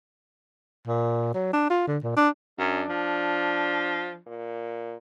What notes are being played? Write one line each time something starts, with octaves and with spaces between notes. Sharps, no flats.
A#2
F#3
D4
F4
D3
A#2
D4
F#2 D4
F3
A#2